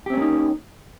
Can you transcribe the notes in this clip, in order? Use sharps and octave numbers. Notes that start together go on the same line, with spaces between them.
A#3 C4 C#4 D#4 G4